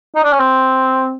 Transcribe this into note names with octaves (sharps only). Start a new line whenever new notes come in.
D#4
D4
C#4
C4